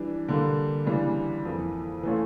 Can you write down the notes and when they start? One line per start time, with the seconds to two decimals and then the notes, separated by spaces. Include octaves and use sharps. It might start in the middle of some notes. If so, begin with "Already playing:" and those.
Already playing: E3 G3 D4
0.28 D3 G3 A#3
0.86 C#3 E3 G3 D4
1.45 F2 E3 A#3
2.03 E3 A3 C#4 F4